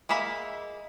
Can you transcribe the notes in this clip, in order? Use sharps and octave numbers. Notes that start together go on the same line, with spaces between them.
G#3 A#3 E5 B5